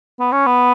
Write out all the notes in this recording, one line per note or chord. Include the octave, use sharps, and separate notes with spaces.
B3
C#4
B3